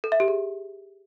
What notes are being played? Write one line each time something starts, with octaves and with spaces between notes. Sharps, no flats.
A4
E5
G4
G#4